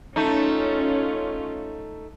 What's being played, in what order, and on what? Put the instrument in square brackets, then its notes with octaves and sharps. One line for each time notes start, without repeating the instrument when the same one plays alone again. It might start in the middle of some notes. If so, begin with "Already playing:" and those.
[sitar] A3 D#4 [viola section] C#4 F4